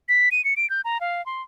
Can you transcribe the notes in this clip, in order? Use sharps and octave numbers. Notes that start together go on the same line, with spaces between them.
B6
D#7
C#7
D7
G6
A#5
F5
C6